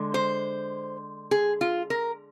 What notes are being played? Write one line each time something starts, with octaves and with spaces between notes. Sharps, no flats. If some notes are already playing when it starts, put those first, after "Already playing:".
Already playing: D3 G#3
C5
G#4
F4
A#4